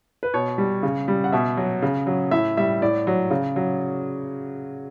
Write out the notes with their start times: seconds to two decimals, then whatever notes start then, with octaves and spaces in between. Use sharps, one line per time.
0.23 B4
0.34 B2 C#5
0.58 G3
0.83 C#3
1.08 G3
1.24 F#5
1.32 B2 E5
1.57 F#3
1.82 C#3
2.07 F#3
2.31 A2 E5
2.57 G3 E5
2.82 A2 D5
3.07 F#3
3.31 C#3
3.56 F#3